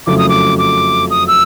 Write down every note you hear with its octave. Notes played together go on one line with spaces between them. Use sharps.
F#1 F2 C#3 F#3 A3 D6
D#6
D6
D6
D#6
E6